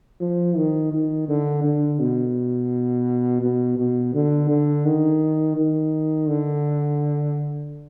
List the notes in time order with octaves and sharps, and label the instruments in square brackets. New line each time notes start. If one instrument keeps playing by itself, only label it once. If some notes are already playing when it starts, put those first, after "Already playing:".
[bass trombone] F3
D#3
D#3
D3
D3
B2
B2
B2
D3
D3
D#3
D#3
D3